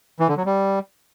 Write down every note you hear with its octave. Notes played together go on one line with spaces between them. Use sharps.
E3
D3
F#3
G3